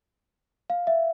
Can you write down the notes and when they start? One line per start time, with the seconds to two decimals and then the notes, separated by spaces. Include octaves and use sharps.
0.70 F5
0.87 E5